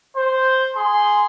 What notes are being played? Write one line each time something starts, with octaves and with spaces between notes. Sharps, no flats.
C5
G#4 C6